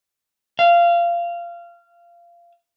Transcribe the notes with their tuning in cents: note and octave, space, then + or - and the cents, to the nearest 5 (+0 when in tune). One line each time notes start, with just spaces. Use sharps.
F5 -20